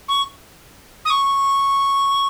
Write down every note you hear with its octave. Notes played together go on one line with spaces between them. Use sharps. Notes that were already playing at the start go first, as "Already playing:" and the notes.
C#6
D#6
C#6